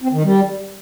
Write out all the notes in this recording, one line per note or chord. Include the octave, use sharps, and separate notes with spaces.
C4
D#3
G3